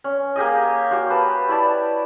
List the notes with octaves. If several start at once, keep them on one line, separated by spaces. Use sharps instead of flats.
C#4
A#3 G4 G#4 D#5
F#4 G4 F5
B4 A5
E4 D5 A5